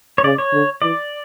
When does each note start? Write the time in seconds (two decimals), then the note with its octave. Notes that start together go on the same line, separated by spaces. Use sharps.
0.18 C#5
0.24 C#3 D5
0.38 C#5
0.53 D3
0.82 E3 D5